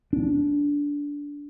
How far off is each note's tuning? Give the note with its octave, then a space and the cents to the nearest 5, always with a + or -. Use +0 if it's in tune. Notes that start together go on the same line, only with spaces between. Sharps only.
D4 -20